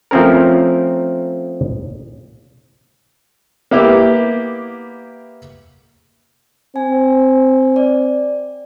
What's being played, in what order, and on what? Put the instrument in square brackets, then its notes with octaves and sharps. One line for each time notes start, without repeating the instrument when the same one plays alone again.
[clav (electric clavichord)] F3 A3 C4 C#4 A#4
[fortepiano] A#3 B3 E4 G4
[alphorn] C4 [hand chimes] G#5
[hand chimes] D5